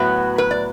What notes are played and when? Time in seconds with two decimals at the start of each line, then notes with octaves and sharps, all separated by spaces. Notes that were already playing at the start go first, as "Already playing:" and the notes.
Already playing: A2 F#3 B3 F#4
0.38 B4
0.51 D5